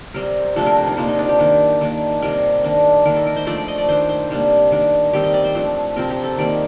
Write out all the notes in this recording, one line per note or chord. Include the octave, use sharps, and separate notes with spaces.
C3 G3 C4 A#4
C3 F3 A3 D4 A4
A#4
D4
D#4
C3 F3 A#3 D4 F4
D#4
D4
G4
D#3 A#3 D4
D#3 A#3 D4
C3 G3 D4 A#4
D#3 A#3 D4
D#3 A#3 D4 A#4
A4
A#4
C5
F3 A3 D4 D5
D5
D#5
D5
D#3 A3 D4 C5
C5
C3 G3 A#3 D4
D#3 A#3 D4
D#3 G3 C4 G4
D#5
D5
C5
F3 A3 D4
C3 F3 C4 A#4
G4
A4
D#3 G3 A#3 D5